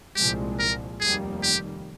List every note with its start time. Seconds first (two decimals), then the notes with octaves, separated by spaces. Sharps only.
0.16 C2 A#2 F3 G#3 G4
0.59 A#4
1.01 F1 D#2 D#3 G3 A#3 G#4
1.43 G4